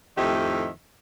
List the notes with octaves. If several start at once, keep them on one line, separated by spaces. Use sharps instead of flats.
F2 A2 D#3 D#4 G4 E5